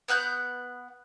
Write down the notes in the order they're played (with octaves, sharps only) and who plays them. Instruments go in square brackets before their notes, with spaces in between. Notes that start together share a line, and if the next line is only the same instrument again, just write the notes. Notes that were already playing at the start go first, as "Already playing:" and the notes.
[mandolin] B3 F#5 F#6 G6